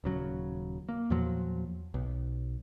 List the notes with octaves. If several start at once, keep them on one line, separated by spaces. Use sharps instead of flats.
D#1 C#3 F#3
A#3
E2 A#2 F3 F#3
B1